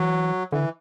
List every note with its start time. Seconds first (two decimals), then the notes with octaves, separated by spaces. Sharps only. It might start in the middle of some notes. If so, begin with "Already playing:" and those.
Already playing: E3 F#3
0.52 D3 E3